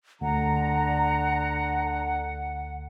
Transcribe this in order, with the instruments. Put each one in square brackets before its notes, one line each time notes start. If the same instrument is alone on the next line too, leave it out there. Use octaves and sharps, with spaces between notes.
[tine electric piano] D2 [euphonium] D3 [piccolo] F#5 [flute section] A#5